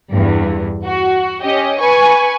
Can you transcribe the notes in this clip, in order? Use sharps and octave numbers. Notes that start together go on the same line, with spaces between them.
E2 G2
F#4
C#4 G4 D#5
B4 G#5 C#6